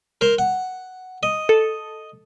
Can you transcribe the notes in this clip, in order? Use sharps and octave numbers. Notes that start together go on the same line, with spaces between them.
A#4 C5
F#5
D#5
A4